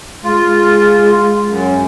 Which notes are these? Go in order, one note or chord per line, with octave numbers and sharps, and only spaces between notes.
G#3 F4
F#2